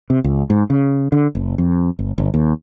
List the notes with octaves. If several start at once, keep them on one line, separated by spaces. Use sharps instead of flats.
C3
C#2
G#2
C#3
D3
F#1
F2
G1
G1
D#2